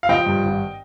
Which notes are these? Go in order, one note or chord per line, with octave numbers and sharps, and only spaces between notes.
F5
F3 D#5 G5
G2
G#1